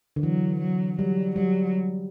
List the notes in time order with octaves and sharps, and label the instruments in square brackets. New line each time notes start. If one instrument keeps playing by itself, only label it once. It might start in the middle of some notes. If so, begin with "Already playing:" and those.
[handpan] D3
[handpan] E3 [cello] F#3
[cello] F#3
[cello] F#3 [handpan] G3
[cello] F#3 [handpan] G3